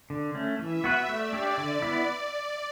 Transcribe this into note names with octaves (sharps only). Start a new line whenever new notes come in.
D3
A3 C#4
E3 E5
B3 F#4 B4
A3 D5
D4 G4 C#5
D3
B3 E4